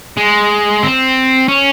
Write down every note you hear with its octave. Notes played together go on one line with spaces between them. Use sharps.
G#3
C4
C#4